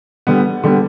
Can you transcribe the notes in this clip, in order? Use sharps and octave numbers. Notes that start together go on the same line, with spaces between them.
D3 G3 B3
D3 G3 B3